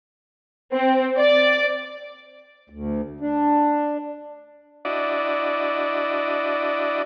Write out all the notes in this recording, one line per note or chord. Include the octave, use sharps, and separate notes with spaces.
C4
D5
D2
D4
D4 E4 F#4 D5 D#5